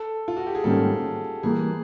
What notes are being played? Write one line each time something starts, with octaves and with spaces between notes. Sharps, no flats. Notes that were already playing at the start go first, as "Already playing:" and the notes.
Already playing: A4
F4
F#4
G4
G#4
G#2 D#3 G3 A#3 C#4 A4
E3 G3 A#3 G#4